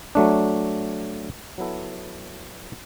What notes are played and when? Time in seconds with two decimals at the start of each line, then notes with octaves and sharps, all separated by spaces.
0.15 F#3 A3 D4
1.58 F#3 B3 E4 A4